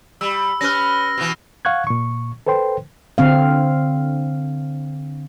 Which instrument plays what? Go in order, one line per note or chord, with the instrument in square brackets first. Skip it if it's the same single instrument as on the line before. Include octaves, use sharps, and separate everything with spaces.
[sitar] G3 [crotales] E6
[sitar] C#4 B4 [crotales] F6 A#6
[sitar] B2 E3
[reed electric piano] F5 F#5 C#6 F#6 G#6
A#2 C#6
A4 B4 C5 G5 C6
[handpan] D3 C4 F5